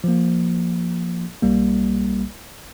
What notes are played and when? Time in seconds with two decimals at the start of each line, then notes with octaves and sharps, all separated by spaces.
0.04 F3 A#3
1.42 B1 G3 A#3